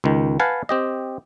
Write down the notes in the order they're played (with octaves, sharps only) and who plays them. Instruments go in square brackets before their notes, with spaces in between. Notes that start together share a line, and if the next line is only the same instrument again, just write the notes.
[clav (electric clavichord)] C#2 D#3
B4 F5 F#5 G#5 A5
C4 G4 D#5